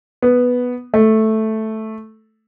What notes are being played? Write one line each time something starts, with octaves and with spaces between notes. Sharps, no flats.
B3
A3